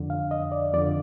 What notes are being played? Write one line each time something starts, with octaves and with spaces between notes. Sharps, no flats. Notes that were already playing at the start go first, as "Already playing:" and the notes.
Already playing: F2 D3
F5
D#5
D5
F2 D3 D5